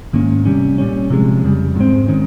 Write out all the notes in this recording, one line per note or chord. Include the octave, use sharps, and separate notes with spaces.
G#2 D#3 A#3 C#4
C3 G3 C#4
A#2 G3 C#4
C3 F3 G#3
F2 C#3 G3
G#2 F3 G#3 C4
D#3 G#3 C#4